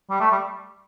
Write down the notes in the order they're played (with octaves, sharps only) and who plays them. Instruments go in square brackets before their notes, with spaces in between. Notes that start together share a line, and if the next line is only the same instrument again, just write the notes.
[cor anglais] G3
A3
G3